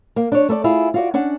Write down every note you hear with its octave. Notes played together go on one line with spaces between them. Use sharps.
A#3
D4 C#5
A3 A4 A#4 D5
E4 F4 G#4
F4 F#4 D5
C#4 D4 F#5